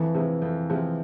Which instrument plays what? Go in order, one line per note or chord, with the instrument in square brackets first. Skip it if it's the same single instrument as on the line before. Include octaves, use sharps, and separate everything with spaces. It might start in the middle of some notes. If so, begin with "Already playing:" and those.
Already playing: [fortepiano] F2 [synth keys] E3
[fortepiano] C3 F3 G#3
F2
C3 F3 G#3